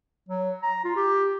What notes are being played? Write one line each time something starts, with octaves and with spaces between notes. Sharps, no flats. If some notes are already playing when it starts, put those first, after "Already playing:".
F#3
A#5
F4
G4